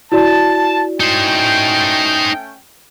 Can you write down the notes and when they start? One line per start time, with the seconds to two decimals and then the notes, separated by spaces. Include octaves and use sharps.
0.12 E4 F#4 D5 A5
1.00 A3 C#4 D#4 C5 G5